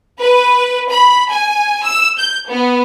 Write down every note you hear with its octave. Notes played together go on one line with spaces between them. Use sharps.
B4
B5
G#5
E6
G6
B3